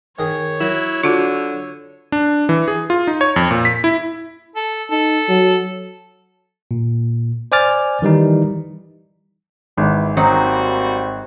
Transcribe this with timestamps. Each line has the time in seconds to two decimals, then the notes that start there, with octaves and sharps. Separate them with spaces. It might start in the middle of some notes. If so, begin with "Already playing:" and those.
0.19 D#3 G#4 C#5
0.61 F#3 E4
1.03 D3 F4 F#4
2.12 D4
2.49 E3
2.68 G#4
2.90 F4
3.07 D#4
3.21 C#5
3.36 F2
3.51 A#2
3.65 B6
3.84 E4
4.55 A4
4.91 D#4 A4
5.29 F#3
6.71 A#2
7.52 C5 D5 G#5 D6 F6 A6
8.02 D#3 E3 G3 D#4
9.77 G#1 E3
10.17 F#3 G3 A#3 C4 D#4 F#4 F#5